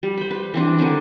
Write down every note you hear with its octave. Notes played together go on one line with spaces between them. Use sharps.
G3
C5 B5
B4
E3 C4 D4
D3 D#3 C4 D4